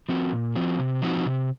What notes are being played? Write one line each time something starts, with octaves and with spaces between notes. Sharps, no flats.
F3 C4 F#4
A#2
F3 C4 F#4
C3
F3 C4 D#4 F#4
C3